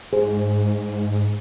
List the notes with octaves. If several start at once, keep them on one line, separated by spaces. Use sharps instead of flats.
G#2 G#4 C5